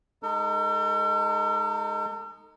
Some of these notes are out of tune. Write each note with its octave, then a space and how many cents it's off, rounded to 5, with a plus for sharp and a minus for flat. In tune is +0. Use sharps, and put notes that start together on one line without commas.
G#3 +0 D#4 +0 A4 +45